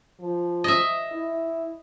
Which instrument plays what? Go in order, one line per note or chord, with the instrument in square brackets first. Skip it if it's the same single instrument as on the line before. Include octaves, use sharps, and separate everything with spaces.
[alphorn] F3
[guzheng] D#5 E5
[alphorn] E4